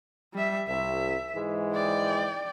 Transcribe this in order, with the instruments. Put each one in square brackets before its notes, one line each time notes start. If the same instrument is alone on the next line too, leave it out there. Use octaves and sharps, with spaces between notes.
[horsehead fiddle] G3 E5
[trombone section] C2 [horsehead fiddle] E5
[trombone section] G#2 E3 G#3
[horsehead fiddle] D5 G5